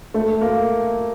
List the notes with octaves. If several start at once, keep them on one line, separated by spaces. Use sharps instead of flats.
A3
A#3